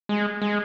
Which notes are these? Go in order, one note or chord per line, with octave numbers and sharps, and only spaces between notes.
G#3
G#3